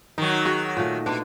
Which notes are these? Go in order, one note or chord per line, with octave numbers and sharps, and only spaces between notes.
D#3 F#3 D#4
F#4 G#4
A#2 A3
B2 D4